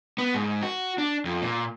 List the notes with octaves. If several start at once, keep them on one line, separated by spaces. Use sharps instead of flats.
B3
G#2
F#4
D4
F2
A#2